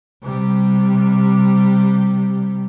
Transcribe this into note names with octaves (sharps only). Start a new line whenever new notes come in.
C3 G3